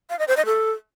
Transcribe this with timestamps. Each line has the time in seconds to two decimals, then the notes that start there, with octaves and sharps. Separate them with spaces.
0.10 F5
0.19 D#5
0.28 C5
0.37 D#5
0.46 A4